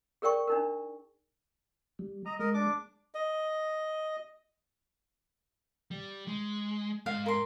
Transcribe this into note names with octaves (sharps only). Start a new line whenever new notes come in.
G#4 A#4 D5 G5 C#6
D4 D#4 A#4
G3
D#5 A#5 D#6
G#3 A#4 D#5
D4 D6
D#5
G3
G#3
G#2 F5
A#4 C6